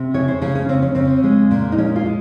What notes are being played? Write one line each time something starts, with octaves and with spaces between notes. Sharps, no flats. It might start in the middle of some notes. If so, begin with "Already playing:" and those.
Already playing: C3
C#3 C#5
C5
C#3 G#4
C#4
C#3 C4
C#4
C#3 C4
G#3
A#2
D#4
G#3 C#4
F4
G#3